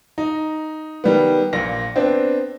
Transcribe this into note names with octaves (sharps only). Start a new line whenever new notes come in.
D#4
D#3 G3 B3
A#1 A#2 A#6
B3 C4 D4